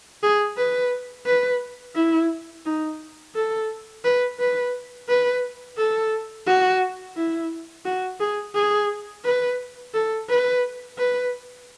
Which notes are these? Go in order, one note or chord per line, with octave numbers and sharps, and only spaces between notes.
G#4
B4
B4
E4
D#4
A4
B4
B4
B4
A4
F#4
E4
F#4
G#4
G#4
B4
A4
B4
B4